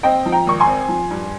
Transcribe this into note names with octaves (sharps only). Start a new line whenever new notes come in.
C4 D#5 G5
F3
G5 A#5
G#1 C#6
G#5 C6
C4
F3
G2